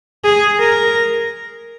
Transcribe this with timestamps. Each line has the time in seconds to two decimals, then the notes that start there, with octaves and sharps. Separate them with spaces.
0.24 G#4
0.59 A#4